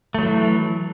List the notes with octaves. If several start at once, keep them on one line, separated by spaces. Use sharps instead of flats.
E3 F#3 A3